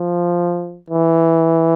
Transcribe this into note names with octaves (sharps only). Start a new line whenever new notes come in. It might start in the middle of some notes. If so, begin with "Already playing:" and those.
Already playing: F3
E3